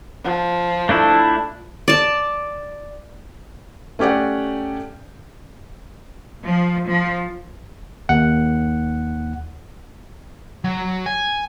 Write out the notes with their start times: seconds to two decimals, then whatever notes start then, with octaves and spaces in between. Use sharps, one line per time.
0.25 F3
0.89 A3 D4 E4
1.88 D5 A5
3.99 A3 C#4 G4 D5 F#5
6.45 F3
6.87 F3
8.09 D#2 F#5
10.65 F#3
11.06 G#5